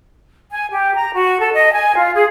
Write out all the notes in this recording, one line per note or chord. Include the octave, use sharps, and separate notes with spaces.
G#5
G4
A#5
F#4
A4
D#5
G#5
F4
G#4